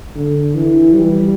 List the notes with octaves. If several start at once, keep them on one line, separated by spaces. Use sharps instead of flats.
D3
E3
G3